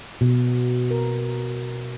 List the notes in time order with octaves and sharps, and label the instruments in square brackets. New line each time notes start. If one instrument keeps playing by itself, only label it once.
[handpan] B2
A#4